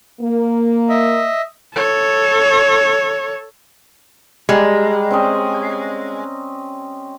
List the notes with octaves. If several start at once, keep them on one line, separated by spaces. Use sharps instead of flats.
A#3
D#5 E5
A4 C#5
G3 G#3 A#5
C4 C#4 D#5